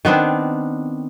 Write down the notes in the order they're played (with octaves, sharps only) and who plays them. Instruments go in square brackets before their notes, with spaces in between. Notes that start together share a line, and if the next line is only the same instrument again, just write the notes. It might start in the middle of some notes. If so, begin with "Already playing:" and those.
[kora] D#3 B3 C4 D4